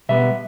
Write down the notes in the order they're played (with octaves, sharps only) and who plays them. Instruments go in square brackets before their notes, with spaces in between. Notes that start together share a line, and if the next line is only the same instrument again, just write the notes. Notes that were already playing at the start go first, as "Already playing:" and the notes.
[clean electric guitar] B2 G3 B3 E5